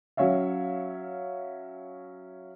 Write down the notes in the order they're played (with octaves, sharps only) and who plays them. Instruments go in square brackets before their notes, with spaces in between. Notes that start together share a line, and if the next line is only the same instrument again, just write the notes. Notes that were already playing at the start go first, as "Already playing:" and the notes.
[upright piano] F#3 C#4 C#5 E5 F5